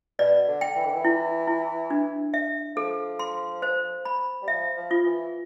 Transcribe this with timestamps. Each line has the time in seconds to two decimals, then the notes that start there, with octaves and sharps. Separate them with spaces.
0.19 B2 D5
0.48 D3
0.61 G5
0.76 E3
0.85 D3
0.94 E3
1.04 E4
1.47 E4
1.90 D4
2.34 E5
2.76 F3 A4
3.19 C6
3.62 C5
4.05 B5
4.42 G3
4.48 F3 E5
4.77 F3
4.91 F4
5.05 E3